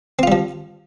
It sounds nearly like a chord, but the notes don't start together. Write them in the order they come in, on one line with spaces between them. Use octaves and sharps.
C4 F4 G3 F3